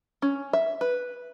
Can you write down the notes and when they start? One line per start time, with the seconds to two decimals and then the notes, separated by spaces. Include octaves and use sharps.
0.22 C#4
0.53 E5
0.81 B4